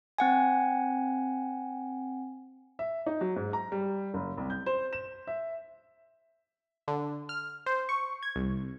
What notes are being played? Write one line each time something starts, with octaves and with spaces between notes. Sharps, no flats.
C4 F#5 G#5
E5
D#4
F#3
G#2
A#5
G3
F#1
C2
G6
C5
E7
E5
D3
F6
C5
C#6
G#6
C2